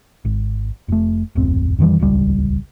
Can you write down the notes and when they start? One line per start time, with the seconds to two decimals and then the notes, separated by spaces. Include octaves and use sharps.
0.25 G#1
0.88 F1 A3
1.35 D1 G#1 F2 C4
1.78 F2 D#3 E3 G3
1.99 D#1 G#1 C#2 G3